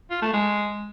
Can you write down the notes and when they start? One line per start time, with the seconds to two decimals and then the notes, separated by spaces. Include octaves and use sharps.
0.10 F4
0.22 A3
0.33 G#3